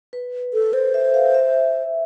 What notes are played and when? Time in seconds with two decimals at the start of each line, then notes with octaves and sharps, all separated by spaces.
0.13 B4
0.54 A4
0.73 A4 C5
0.94 E5
1.14 F5
1.34 E5